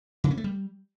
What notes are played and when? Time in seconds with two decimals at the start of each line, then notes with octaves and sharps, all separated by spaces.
0.24 C#3
0.31 C#4
0.37 A3
0.44 G3